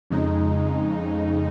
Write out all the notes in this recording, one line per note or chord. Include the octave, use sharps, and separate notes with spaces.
F2 C#3 G#3 D#4